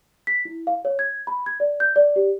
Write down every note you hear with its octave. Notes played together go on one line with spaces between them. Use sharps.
B6
E4
F5
C#5
G#6
B5
G#6
D5
G6
D5
G4